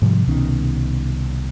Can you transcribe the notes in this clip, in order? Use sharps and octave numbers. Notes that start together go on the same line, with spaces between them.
G#2 C3 F3 G3
C2 B2 D#3 C#4